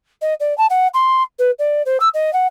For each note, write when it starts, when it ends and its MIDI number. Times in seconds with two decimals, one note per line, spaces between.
0.22 0.34 75
0.40 0.56 74
0.58 0.66 81
0.70 0.88 78
0.94 1.23 84
1.39 1.51 71
1.59 1.82 74
1.86 1.97 72
2.00 2.09 88
2.14 2.33 75
2.33 2.47 78